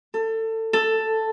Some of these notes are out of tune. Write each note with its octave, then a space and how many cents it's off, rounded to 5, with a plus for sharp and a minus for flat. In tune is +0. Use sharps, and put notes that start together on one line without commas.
A4 +25
A4 +5